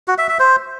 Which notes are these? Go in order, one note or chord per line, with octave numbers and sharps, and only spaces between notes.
F#4
E5
E5
C5